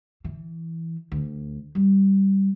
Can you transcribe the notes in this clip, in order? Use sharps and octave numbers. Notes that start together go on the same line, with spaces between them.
E3
D2
G3